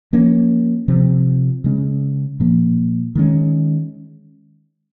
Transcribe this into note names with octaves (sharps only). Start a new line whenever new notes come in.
F3 A#3 C#4
C3 F3 C4
C#3 G#3 C#4
A#2 F3 A#3
D#3 G#3 C#4